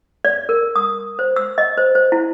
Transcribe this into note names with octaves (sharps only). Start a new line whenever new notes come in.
D5
A#4
D#6
C5
E6
D#5
C5
C5
E4